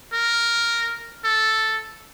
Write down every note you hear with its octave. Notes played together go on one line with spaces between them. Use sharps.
A#4
A4